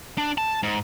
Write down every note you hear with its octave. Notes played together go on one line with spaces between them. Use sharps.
D4
A5
G#2